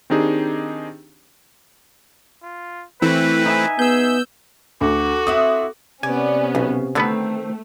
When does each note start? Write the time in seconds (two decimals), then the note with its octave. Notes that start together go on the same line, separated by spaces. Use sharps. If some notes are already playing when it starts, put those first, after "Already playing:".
0.10 D#3 C4 D4 D#4 G4 G#4
2.43 F4
3.02 E3 A3 C4 E4 B4 B5
3.46 D#4 E5 G#5
3.79 B3 G#4 E6 G6
4.81 D2 F#4 A4 D6
5.27 C4 E4 F#5 D#6
6.03 C3 B3 C#4 D5 G#5
6.55 B1 C#3
6.95 D3 D#3 A3 B3 C4 B4